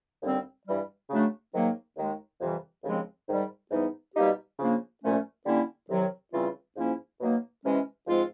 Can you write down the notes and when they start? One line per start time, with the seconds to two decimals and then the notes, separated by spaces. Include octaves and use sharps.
0.23 D#2 D3 G3 C4
0.66 G2 E3 G3
1.10 C#3 F#3 A3 D4
1.53 G#2 D#3 F#3 A#3
1.97 D#2 D#3 G#3
2.41 F2 C3 E3 G3
2.84 D#2 C#3 F3 G#3 C4
3.28 G#2 D#3 G3
3.71 G#2 E3 G3 B3 D#4
4.15 B2 G3 A#3 D#4 G4
4.59 C#3 F3 A#3 D4
5.02 C2 A#2 F3 A3 C#4
5.45 D3 G3 A#3 C#4 E4
5.89 C2 C3 D#3 F#3
6.32 C#3 E3 G3 C4 F4
6.77 G#2 F3 A#3 C#4 E4
7.20 B2 F#3 A#3 D#4
7.64 C3 E3 G#3 C#4
8.07 G#2 F3 G#3 C4 F4